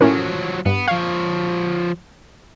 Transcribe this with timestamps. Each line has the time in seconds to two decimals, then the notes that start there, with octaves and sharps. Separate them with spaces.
0.01 A2 F3 F#3 C#4 A#4
0.66 G2 B3
0.88 F3 C#5 F5